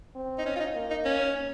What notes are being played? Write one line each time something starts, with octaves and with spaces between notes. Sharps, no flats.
C4
D#4
C#4
F4
D#4
A#3
D#4
C#4